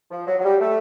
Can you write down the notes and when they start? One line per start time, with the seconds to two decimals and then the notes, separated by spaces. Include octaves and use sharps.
0.11 F3
0.27 F#3
0.39 F#3
0.44 G3
0.60 A3